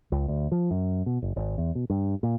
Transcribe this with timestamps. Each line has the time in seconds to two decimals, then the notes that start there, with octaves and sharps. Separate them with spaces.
0.12 C#2
0.28 D2
0.52 F3
0.71 F#2
1.06 B2
1.22 F#1
1.36 G#1
1.58 E2
1.75 B2
1.90 G2
2.23 A#2